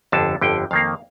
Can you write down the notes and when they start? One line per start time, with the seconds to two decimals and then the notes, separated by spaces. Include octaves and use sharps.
0.12 G1 F2 D3 A5
0.41 G1 F2 D3 G5
0.71 F2 D#3 A#3 F5